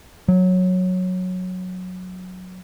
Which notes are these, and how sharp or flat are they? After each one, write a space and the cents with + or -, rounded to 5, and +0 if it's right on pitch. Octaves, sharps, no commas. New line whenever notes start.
F#3 -10